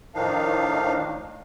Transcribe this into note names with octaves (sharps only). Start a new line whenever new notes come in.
A2 D#3 F3 D4 D#4 F5